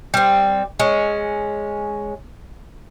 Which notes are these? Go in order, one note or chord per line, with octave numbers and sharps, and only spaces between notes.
G3 C4
G#3 C#4